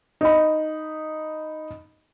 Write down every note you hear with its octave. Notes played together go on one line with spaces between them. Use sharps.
D#4 B5